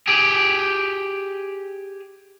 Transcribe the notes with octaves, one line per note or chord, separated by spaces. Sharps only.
G4 G#4